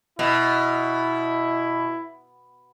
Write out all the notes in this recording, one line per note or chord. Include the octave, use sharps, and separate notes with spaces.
B2 E4